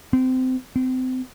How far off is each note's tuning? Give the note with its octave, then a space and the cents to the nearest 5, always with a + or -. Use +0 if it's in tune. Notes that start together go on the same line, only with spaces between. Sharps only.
C4 -25
C4 -30